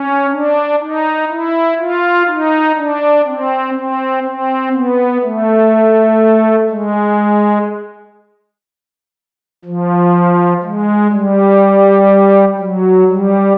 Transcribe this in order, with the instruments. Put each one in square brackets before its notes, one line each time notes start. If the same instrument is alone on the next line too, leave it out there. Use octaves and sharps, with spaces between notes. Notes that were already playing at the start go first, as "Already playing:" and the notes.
Already playing: [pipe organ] C#4
D4
D#4
E4
F4
D#4
D4
C4
C4
C4
B3
A3
G#3
F3
G#3
G3
F#3
G3